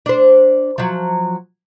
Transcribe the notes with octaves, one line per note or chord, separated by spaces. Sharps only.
D4 C5
F3 F#3